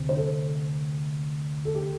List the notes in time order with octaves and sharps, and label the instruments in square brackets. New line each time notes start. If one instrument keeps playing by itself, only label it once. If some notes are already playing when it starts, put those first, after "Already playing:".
Already playing: [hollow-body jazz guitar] D2 C3
[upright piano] C5
A4
A4
G4